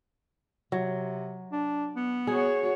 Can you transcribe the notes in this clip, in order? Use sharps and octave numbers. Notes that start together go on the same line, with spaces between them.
C3 F#3
D4
B3
F#4 G#4 C#5